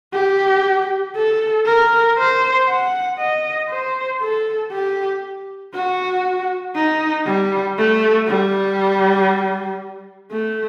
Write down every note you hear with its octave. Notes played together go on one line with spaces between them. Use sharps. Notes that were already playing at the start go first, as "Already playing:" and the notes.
G4
A4
A#4
C5
F#5
D#5
C5
A4
G4
F#4
D#4
G3
A3
G3
A3